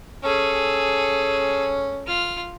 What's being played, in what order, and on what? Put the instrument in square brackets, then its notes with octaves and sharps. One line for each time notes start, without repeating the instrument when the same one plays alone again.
[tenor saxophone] C#4 [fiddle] G#4 A4
[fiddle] F4 F6